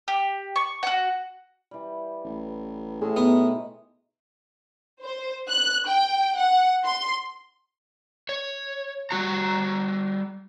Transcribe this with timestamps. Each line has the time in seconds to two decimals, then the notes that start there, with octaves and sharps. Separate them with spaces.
0.08 G4
0.56 C#6
0.83 F#4 F#5
1.71 E3 G3
2.25 A1
3.01 A2 E3 G#3 D4 G#4
3.16 B2 D#3 E3 B3
5.03 C5
5.49 F#6
5.87 G5
6.37 F#5
6.85 C6
8.29 C#5
9.11 G3 F#4 A#5